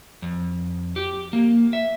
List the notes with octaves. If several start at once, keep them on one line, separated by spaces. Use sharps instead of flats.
F2
G4
A#3
E5